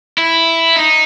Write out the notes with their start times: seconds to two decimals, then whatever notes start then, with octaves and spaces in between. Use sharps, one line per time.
0.18 E4
0.76 D#4